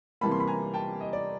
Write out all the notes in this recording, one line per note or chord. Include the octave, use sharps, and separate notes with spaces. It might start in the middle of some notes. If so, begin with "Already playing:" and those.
C3 E3 G3 A#3 A5 B5
C6
B5
G#5 A#5
G5 A5
D#5
D5